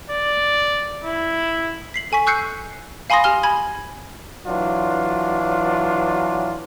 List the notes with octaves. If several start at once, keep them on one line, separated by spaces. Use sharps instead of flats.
D5
E4
B6 C7 F#7
A4 G#5 C#6 B6
C#6 E6 F#6 G6 C7 C#7
F5 G#5 B5 C6 D#6 A#6
G4 G#5 F6 G7
G#5 B5 G#6
E3 F#3 D4 F4